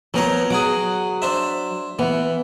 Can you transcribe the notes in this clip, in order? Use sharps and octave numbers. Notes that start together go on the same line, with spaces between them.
F3 F#3 B3 A#4 C#5
F#3 G#4 F#5 D6
D4 C5 E5
E3 B3